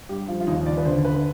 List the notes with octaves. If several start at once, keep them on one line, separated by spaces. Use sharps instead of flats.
G2 G4
F3 F4
F4
D#2 D#4
D#2 D5
B4
D3 C5
D3 B4